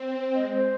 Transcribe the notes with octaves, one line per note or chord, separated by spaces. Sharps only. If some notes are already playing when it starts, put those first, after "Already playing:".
Already playing: C4
G#3 D#5
C5